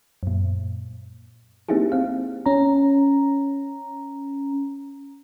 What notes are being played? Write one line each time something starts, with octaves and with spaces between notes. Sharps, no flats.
F#2 A#2
A#3 C4 D#4 E4 G4 G#4
C4 F5
C#4 A#5